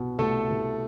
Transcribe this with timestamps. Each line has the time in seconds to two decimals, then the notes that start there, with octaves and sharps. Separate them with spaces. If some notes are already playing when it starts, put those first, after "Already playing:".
Already playing: C2 B2 B3
0.18 C2 A3 A4
0.50 C2